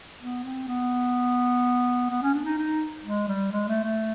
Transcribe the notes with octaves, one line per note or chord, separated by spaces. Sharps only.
B3
C4
B3
B3
C#4
D4
D#4
D#4
G#3
G3
G#3
A3
A3